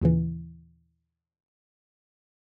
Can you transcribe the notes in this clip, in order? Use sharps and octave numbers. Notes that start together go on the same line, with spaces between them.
D#2 A#2 C#3 E3